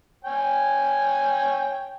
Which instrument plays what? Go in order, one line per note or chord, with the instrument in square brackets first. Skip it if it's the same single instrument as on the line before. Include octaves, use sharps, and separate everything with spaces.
[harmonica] C#5 G5 G#5